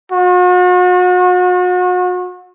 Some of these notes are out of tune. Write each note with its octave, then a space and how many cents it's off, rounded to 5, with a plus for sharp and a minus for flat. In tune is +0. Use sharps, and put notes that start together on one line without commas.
F#4 -40